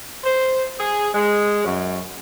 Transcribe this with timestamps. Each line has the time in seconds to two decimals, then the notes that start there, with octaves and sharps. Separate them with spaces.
0.23 C5
0.78 G#4
1.14 G#3
1.65 F#2